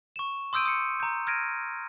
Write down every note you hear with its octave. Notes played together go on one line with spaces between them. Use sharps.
C#6 E7
C6 D#6 E6 G6 D7 D#7
D#6 C#7
A#5 G6
F6 G#6 A#6 D7 D#7